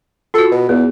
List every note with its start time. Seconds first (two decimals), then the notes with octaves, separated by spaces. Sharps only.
0.34 F4 F#4 A4
0.51 B2
0.69 E2 B3